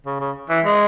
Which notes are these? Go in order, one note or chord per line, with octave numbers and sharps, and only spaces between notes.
C#3
C#3
E3
G#3